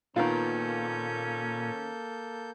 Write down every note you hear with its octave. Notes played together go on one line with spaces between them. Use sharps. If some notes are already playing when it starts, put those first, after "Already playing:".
A#2 D#3 A#3 B3 C#4 F4 A4 G6